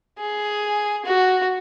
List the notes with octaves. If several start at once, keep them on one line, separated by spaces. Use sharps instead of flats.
G#4
F#4